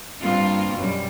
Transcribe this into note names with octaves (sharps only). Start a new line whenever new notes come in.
G2 A#3 C4 F4
F#2 B2 G3